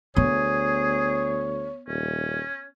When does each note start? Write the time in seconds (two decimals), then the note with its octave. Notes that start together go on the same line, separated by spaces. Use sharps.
0.16 D2 B3 G#4 C#5
1.88 D#1 C#4